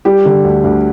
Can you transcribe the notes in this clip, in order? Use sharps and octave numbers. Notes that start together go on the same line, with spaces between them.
G3 G4
D3
D2
D2